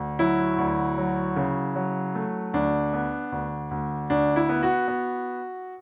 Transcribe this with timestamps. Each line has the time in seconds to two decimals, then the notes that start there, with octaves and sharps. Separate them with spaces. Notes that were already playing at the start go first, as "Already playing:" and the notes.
Already playing: D2
0.19 F#3 E4
0.58 D2
0.98 F#3
1.36 C#3
1.76 F#3
2.15 A3
2.53 D2 D4
2.93 B3
3.32 D2
3.71 D2
4.10 D2 D4
4.36 E4
4.49 B3
4.63 F#4
4.88 B3